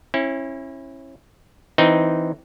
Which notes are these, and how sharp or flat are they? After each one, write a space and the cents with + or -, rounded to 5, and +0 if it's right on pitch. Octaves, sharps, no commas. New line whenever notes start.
C#4 -35 E4 +0
E3 -10 C4 -15 D#4 +0